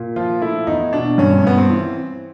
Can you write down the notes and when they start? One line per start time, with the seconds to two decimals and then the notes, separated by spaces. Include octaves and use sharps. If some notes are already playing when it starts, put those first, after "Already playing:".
Already playing: A#2
0.16 F3 F4
0.41 A3 E4
0.67 E2 D#4
0.93 B2 D4
1.18 G2 C#4
1.44 G2 B3
1.58 C4
1.70 E3